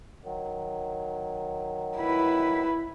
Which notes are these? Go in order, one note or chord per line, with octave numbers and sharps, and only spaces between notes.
D#3 F#3
E4 B4